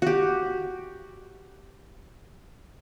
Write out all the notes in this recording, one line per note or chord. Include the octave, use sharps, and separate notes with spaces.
F#4 G4